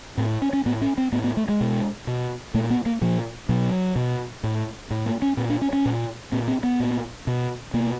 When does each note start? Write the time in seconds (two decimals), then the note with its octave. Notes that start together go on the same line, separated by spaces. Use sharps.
0.18 A2 C4
0.42 C#4
0.53 C#4
0.66 A2 B3
0.81 C#4
0.98 C4
1.12 A2 B3
1.24 B3
1.37 A3
1.48 G#3
1.61 B2
2.07 B2
2.54 A#2 A3
2.70 B3
2.86 A#3
3.01 A#2 F3
3.49 B2 F#3
3.96 B2
4.43 A2
4.90 A2
5.06 A#3
5.22 C#4
5.37 A#2 C4
5.50 D4
5.61 C#4
5.73 C#4
5.85 A#2
6.32 A#2 C4
6.48 C4
6.63 B3
6.80 A#2
7.27 B2
7.74 B2 A#3